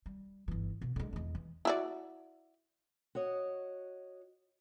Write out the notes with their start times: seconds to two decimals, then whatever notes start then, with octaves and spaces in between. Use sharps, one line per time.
0.06 G3
0.48 G1 E3
0.81 B2
0.96 D3 G#3
1.13 E2 G#3
1.35 E3
1.65 E4 F#4 D5
3.15 F#4 C#5 D#5